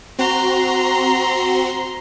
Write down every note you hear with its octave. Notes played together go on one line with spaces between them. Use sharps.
C4 F#4 A#5 C6